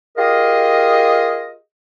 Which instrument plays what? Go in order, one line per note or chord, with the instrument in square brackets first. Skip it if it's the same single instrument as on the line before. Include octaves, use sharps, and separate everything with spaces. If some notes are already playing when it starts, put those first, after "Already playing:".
[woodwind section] F4 G4 G#4 A#4 D#5